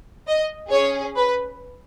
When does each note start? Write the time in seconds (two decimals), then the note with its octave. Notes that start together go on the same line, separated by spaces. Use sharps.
0.27 D#5
0.71 C#4 G#4 C#5
1.17 B4